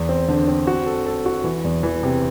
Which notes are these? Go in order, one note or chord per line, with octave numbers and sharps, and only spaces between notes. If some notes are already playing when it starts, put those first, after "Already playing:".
Already playing: E2
C4
D3
C4
F#4
A4
A4
F#4
E3
E2
E3
C3